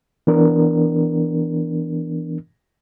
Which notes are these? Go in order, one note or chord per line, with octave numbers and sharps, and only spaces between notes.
E3 B3 D4 A#4